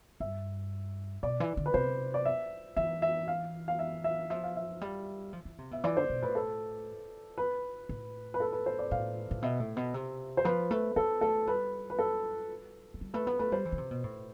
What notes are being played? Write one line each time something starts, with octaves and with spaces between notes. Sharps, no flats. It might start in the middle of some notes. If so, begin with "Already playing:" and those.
G2 E5
B2 D5
E3
D3
B4
C3 C5
D5
E5
E3 E5
E5
F5
F5
E5
E5
F3 E5
F5
E5
G3
F3
E3
C3
B2 E5
E3 D5
D3 C5
B2
A2 B4
A4
B4
A2
B4
A4
B4
C5
D5
A2 F5
A2
B2 E5
A2
B2
C3
C5
F3 B4
A3 B4
B3 A4
A3 A4
G3 B4
B4
A4
F3
G3
A3 B4
B3 B4
A3 B4
G3 C5
E3
D3
C3
B2
A2